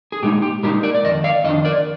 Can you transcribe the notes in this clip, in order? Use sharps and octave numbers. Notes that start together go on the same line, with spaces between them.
G#4
A#2 G#3 D#4 G4
G4
A#2 G#3 D#4 G4 A#4
A#4 D5
D5
F2 D#3 D#5
D5 F5
F2 D#3 D4 D#5
A#4 D5